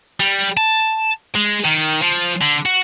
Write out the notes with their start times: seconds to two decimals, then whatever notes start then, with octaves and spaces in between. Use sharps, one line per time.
0.20 G3
0.57 A5
1.35 G#3
1.65 D#3
2.02 F3
2.41 D3
2.66 F#4